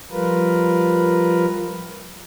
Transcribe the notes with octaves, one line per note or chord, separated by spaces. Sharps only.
F3 G3 F4 A#4 B4